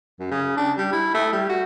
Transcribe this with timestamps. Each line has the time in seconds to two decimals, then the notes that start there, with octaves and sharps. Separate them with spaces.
0.20 F#2
0.31 C#3
0.57 D4
0.78 G3
0.92 E4
1.14 A3
1.33 G3
1.49 F#4